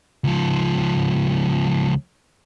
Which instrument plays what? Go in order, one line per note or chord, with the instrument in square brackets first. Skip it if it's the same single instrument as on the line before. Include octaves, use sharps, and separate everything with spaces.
[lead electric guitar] C#2 F3